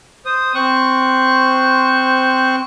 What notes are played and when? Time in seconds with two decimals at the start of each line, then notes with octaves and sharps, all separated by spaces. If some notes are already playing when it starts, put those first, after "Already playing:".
0.26 C5 D#6
0.55 C4 C5 C#6 F#6